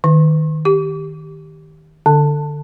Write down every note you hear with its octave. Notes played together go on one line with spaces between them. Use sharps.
D#3
G4
D3